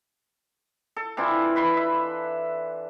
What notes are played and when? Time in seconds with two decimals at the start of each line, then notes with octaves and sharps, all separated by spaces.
0.96 A4
1.17 E3 C4 D4 F4
1.56 B4 B5 C6
1.77 E5